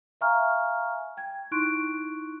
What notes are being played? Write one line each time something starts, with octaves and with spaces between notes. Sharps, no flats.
E5 F5 G#5 A#5 C#6 F6
G5 G#6
D#4 E4 C6 C#6 F#6 D7